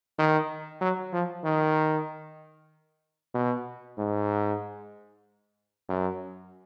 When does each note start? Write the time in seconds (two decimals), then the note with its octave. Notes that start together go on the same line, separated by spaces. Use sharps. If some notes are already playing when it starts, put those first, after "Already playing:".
0.19 D#3
0.81 F#3
1.13 F3
1.44 D#3
3.34 B2
3.98 G#2
5.89 F#2